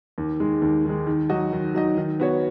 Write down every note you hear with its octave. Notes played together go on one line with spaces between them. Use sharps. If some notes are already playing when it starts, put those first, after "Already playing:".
D#2
D#3 G#3
D#2
D#3 G#3
D#3
F#3 D#4 F#4 D#5
D#3
F#3 D#4 F#4 D#5
D#3
B3 F#4 C#5